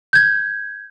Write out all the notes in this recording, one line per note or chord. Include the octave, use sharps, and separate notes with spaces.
G6 G#6